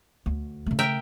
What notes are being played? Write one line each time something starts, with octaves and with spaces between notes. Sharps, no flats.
D2
C#3 A3
A#4 E5 G5